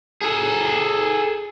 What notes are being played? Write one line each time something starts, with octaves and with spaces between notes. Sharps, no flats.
G#4 A4